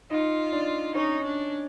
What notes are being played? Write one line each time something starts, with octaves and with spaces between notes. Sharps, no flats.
D#4 F4 D#5
D4 D5
C#4 D#4 C#5
D4